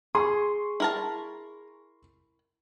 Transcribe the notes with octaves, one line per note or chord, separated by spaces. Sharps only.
G#4 C6 C#6
E4 A#4 A5